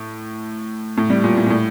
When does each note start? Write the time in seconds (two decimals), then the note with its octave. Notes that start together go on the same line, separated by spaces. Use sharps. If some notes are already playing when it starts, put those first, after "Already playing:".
Already playing: A2
0.97 A2
1.10 G3
1.24 A#2
1.37 A2
1.46 A#2
1.50 A2